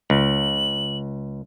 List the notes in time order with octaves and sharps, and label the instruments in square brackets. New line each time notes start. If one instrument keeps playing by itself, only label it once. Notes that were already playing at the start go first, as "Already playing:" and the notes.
[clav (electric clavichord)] C#2 [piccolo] F#7